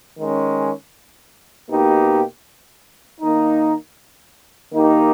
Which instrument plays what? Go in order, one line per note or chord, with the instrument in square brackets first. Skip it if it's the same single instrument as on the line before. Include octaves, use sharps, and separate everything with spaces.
[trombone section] D#3 G#3 C#4
B2 A#3 D#4 G4
D#3 A#3 D#4
D#3 A#3 D#4 G4